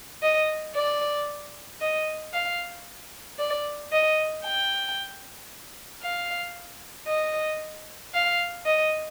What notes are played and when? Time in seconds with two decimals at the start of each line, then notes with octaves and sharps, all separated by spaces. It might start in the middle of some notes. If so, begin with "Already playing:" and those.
0.22 D#5
0.75 D5
1.81 D#5
2.33 F5
3.39 D5
3.92 D#5
4.45 G5
6.03 F5
7.07 D#5
8.14 F5
8.66 D#5